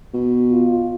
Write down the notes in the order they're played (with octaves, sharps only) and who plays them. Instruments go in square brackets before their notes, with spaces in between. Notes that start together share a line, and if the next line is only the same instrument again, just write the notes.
[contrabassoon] B2
[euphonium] F4